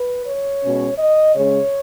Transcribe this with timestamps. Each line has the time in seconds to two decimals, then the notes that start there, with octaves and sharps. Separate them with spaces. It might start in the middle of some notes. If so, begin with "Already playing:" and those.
Already playing: B4
0.26 C#5
0.62 B2 G#3 C#4
0.98 D#5
1.35 C#3 G#3 C#4 C#5